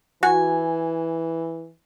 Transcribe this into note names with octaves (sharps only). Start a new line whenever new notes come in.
E3 F#4 G#5